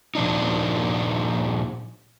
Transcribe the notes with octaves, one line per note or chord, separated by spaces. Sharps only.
A#2 F3 D4 D#4